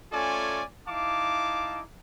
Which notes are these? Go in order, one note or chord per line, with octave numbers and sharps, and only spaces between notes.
A3 C#4 F4 A4 D5 G#5
D#4 E4 F5 A5 D6